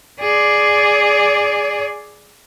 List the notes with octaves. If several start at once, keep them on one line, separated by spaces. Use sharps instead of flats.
G#4 D5